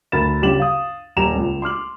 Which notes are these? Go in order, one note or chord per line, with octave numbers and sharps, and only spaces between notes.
D2 A#4 B5 A6 E7
G1 C#3 G4 E7 F#7
F5 D#6
D#1 A#5 E7 F7
C#2
C6 D6 F6 F#7